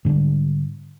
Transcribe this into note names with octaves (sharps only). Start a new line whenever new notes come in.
G#2 D3 G3 D4